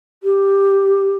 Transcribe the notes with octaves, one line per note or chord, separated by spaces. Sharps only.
G4